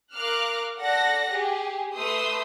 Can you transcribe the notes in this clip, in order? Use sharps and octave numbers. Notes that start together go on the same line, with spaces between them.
A#4 F5 D6 F6 F#6
A4 D5 F#5 F#6 A#6
G4 G#4
A3 B4 C6 D#6 E6 G6